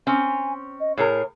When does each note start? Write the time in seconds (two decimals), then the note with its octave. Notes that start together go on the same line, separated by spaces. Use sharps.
0.07 C4 C#4 G#5
0.80 D#5
0.97 A2 G#4 A#4 C#5